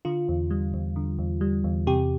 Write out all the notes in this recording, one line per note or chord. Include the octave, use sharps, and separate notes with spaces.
D3 F4
E2
G3
E2
D3
E2
G3
E2
C3 G4